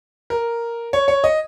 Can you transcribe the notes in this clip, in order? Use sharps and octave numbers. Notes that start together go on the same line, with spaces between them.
A#4
C#5
C#5
D#5